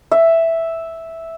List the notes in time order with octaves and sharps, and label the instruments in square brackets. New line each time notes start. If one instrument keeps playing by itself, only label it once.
[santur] E5